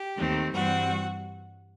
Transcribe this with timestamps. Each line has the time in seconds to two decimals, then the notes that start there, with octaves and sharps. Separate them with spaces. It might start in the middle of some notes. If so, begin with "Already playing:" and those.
Already playing: G4
0.17 D#2 D#3 A3 C4
0.53 G2 E3 G3 C4 F#4